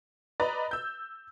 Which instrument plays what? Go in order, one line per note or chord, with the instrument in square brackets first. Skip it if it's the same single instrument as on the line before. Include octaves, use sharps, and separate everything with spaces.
[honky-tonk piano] B4 D5 D#5 A#5 A6
E6 G6